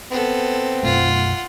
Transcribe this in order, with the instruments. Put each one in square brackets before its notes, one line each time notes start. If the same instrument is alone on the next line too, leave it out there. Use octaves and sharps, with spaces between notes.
[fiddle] B3 A4 [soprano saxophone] C4
[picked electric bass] F#2 B2 A3 [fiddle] F4 F#5